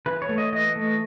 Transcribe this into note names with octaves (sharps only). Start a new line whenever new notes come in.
E3 B4
C#5
A3
D#5
E3 D#5
A3